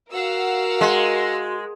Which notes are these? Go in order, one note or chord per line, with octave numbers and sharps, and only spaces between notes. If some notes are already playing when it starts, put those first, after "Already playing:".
F#4 A#4 F5 F#5 E6
G#3